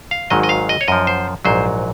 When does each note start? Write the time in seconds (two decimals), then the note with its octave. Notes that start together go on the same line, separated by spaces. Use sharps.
0.11 F5
0.30 G#1 G#2 D#3 F#3 D#5
0.43 D#5
0.49 F5
0.69 D#5
0.81 C#5
0.88 F#2 F3 D#5
1.07 C5
1.45 A#1 G#2 F#3 C5